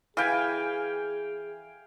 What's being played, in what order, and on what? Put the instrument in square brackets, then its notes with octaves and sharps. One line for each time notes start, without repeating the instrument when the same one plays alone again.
[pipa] E3 [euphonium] G#4 [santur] F5 G5 G#5